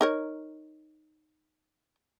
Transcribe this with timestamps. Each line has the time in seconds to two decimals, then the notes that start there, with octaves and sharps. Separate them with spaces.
0.01 D#4 A#4 C#5